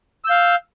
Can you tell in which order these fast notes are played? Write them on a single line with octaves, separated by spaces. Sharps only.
E6 G6 F5